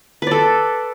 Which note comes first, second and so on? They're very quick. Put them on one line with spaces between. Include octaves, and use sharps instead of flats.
B4 D5 A4